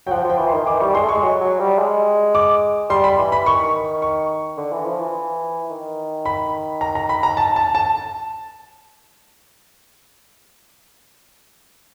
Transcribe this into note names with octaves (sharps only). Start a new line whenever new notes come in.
F#3 G5
F3 F#5
F3
G5
E3
C6
D#3
E3 D6
G3 C#6
G#3 C6
A3
G#3 C#6
F#3
F#3
G3
G#3
D6
G3 C6
B5
E3
B5
D#3 C#6
C#6
D3
E3
F3
E3
D#3
B5
A#5
A#5
B5
A#5
A5
A5
A5